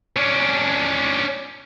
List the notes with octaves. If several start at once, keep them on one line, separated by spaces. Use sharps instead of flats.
C#4 D4